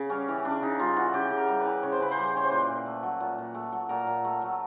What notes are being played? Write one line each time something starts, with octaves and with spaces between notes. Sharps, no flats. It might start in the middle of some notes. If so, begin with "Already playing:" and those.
Already playing: C#3
G3 C#4
E3
C#3 D4
C#3 D#4
G3 F4
E3 F#4
C#3 G4
C#3
A#4
G3
B4
E3
C#3 C#5
C5
C#3 B4
C5
G3
E3 C#5
C5
A#2 B4
A#2
A3
F#3
A#2
A#2
A3
F#3
A#2 A#4
A#2
A3
F#3